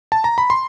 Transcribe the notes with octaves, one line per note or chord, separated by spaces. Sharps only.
A5
A#5
B5
C6